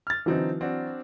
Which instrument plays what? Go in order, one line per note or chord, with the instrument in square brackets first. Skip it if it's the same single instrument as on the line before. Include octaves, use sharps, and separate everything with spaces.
[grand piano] F6 A6
[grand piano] D3 C4 D#4 [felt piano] E3 F#3
[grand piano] C4 D4 F#4